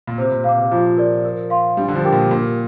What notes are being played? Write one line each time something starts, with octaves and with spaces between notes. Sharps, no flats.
A#2
C3 C5
A#2
A#2 F5 D6
C3
F3 F4
A#4 D5
A#4
F5 C6
G3 D4
D3
F3
G4 A#4 G5 D6
A#2
A#2 A#4